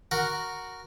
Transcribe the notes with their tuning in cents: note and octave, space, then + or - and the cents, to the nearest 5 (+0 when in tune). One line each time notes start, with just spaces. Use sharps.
F#4 +0 A#4 +0 F#5 +0